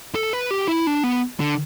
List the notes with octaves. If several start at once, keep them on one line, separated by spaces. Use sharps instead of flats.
A4
B4
G4
E4
D4
B3
D3